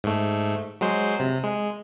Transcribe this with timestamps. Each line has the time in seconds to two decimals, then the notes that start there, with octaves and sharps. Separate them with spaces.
0.04 G#2 A3
0.81 F#3 G#3 C5
1.20 C3
1.44 G#3